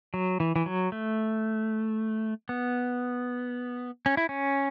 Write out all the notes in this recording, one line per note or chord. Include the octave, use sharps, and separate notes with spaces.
F#3
E3
E3
F#3
A3
B3
C#4
E4
C#4